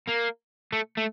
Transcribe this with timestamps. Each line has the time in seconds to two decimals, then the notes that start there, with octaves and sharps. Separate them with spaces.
0.09 A#3
0.72 A3
0.97 A3